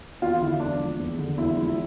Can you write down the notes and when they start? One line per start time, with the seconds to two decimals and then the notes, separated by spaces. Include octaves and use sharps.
0.22 E2 F4
0.41 D3 E4
0.60 E2 D4
0.80 F3
0.98 E2
1.19 D3
1.38 E2 E4
1.57 F3 E4